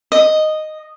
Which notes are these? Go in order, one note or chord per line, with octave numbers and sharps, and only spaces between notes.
D#5